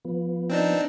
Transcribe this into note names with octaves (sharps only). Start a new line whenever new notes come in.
F3 B3
C4 D4 D#4